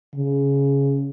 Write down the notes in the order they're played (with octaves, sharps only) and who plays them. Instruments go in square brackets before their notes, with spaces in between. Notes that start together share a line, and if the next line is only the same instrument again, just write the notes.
[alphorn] C#3